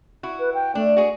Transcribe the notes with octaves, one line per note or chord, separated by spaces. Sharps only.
E4 F#4
B4
G5
A3 D4
F#4 G#4